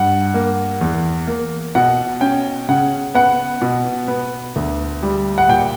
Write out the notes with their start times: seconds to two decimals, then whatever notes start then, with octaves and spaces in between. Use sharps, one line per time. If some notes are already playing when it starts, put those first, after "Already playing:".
Already playing: G2 F#5
0.34 A#3
0.81 E2
1.27 A#3
1.75 B2 F#5
2.21 C#4 G5
2.69 C#3 F#5
3.15 B3 F#5
3.62 B2
4.08 B3
4.56 D2
5.03 G3
5.38 F#5
5.49 A#2 G5